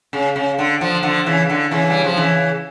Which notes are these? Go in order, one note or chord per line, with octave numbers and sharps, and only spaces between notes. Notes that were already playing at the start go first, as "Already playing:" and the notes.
C#3
C#3
D3
D3 F3
D3 F3
C#3 E3
D3
C#3 E3
G3
F3
C#3 E3